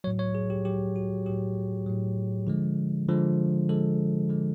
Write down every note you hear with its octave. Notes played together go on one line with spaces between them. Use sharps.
A2 F#3 C#5
C#5
G#4
G4
A2 F#3 G4
F#4
A2 F#3 G4
A2 F#3
D3 F3 G#3
D3 F3 G#3
D3 F3 G#3 A4
D3 F3 G#3